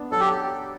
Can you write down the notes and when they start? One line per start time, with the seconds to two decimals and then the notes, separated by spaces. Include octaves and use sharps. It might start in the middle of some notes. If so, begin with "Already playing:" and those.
Already playing: B3 D4
0.12 F#3 A4
0.20 G4